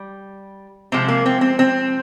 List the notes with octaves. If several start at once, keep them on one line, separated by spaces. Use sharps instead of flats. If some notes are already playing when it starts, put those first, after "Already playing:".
Already playing: G3
C3 F3 G#3 C4
A#3
C4
C4
C4